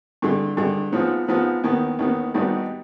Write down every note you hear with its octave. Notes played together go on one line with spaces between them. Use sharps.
G2 D3 G#3
G2 D3 G#3
G#2 F3 B3 F4
G#2 F3 B3 F4
D#2 D#3 B3
D#2 D#3 B3
G#1 G#2 G3 B3 D#4